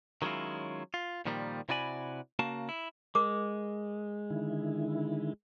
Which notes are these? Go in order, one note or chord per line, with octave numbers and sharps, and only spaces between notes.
D#3 F#3 G#3 C#4 E4 F4
F4
A#2 D#3 F3 G3 A#3
C3 E4 F#4 D5 G#5 B5
C#3 A#3 F#4 A5
E4
G#3 A#4 D6
D3 D#3 E4